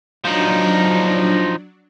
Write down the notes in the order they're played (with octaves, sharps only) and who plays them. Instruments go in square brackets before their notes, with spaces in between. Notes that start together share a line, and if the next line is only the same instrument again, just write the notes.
[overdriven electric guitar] F3 D#4 [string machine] F#3 D4